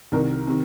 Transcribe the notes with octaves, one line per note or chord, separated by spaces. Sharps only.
C2 C3 D#3 A#4
C3 D#3